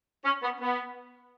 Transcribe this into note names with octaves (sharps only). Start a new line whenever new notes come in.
C#4
B3
B3